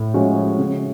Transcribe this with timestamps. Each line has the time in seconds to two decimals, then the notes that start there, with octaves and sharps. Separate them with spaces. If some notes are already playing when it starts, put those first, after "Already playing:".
Already playing: A2
0.14 F3 G#3 C#4 F#4
0.59 C#3